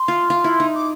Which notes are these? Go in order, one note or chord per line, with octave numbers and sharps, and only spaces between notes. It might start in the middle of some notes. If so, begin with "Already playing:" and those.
Already playing: C6
F4
F4
E4
D#4
D6